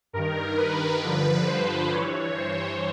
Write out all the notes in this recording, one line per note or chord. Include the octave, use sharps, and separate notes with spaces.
G2 D#3 A#4
B4
G2 D3 F3
C5
G2 E3 C#5
C5